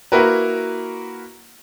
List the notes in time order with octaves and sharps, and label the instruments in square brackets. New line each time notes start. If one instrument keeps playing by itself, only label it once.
[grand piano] A#3 E4 F#4 A#4 B4